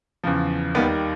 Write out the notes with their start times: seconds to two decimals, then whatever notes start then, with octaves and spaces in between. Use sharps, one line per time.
0.24 E2 C#3 F3
0.75 D#2 D#3 G3 B3